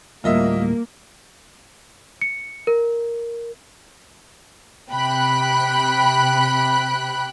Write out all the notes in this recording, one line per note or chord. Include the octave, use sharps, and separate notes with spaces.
D2 A2 G3 A#3 F4 D#5 E5
C#7
A#4
C3 G5 B5 F#6